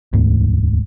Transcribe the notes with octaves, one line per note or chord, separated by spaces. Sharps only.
E1 D2 G#2